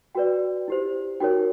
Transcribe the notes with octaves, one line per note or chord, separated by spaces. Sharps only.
F#4 B4 D5 G5
E4 G4 C5
D#4 F#4 A#4 C#5 G5